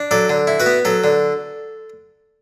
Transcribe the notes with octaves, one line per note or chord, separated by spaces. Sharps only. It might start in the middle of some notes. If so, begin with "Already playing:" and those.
Already playing: D4
F#3 A4 D5
D3
E4
F#4 B4
B3
F#3 A4
D3